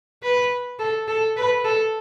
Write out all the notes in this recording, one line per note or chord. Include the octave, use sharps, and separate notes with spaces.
B4
A4
A4
B4
A4